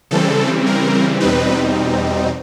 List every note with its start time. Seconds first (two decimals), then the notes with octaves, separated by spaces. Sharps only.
0.11 C#3 E3 G3 C4 A4
0.66 A#4
1.20 E2 B2 G3 C4 D#4 B4